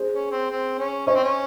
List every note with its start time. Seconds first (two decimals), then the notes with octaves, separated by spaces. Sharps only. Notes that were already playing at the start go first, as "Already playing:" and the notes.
Already playing: G#4 C5
0.12 C#4
0.31 C4
0.50 C4
0.78 C#4
1.06 C#4 C5 D#5
1.15 C4
1.23 C#4